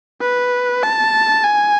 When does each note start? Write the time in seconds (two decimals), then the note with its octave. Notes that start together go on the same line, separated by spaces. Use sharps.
0.21 B4
0.83 A5
1.44 G#5